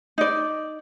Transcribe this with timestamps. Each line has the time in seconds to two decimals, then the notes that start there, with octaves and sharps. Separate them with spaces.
0.18 D#4 D5